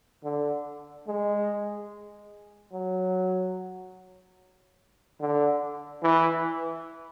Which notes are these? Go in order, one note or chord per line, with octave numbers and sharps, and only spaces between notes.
D3
G#3
F#3
D3
E3